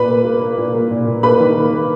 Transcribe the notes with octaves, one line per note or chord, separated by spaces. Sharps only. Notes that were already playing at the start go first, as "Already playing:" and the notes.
Already playing: A#2 B4 B5
A#3
A#3
A#3
A#2
A#3
A#2
A#2
A#3 B4 B5
D#3
A#3
A#3